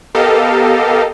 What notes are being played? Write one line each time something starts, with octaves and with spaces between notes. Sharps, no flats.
B3 G4 A4 A#4 D#5 F5